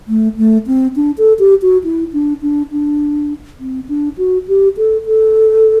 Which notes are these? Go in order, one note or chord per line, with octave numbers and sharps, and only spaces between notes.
A3
A3
C4
D4
A4
G4
F#4
E4
D4
D4
D4
C4
D4
F#4
G4
A4
A4